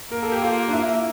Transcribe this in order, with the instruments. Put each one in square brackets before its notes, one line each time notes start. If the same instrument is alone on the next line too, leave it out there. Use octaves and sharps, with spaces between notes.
[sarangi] A#3 [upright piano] A#4
[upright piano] A4
G4
F4
D4
E4